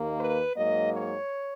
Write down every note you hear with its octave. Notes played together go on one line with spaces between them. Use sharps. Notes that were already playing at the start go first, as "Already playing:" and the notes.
Already playing: D#2 D#3 A#3
B4
G#2 F#3 A#3 D#5
C#5